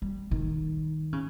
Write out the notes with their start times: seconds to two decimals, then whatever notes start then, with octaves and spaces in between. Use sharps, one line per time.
0.02 G3
0.31 D#3
1.13 C#3